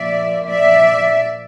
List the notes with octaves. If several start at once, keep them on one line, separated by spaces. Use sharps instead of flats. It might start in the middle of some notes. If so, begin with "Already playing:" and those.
Already playing: A#2 F3 D5 E5
D5 E5